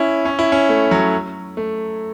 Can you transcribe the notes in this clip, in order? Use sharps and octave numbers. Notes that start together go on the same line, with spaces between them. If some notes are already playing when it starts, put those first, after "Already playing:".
Already playing: C#4 E4
C#4
E4
C#4
A3
F#3
A3